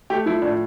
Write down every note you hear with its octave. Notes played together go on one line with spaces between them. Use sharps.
A3 G4
F3 E4
A2 D4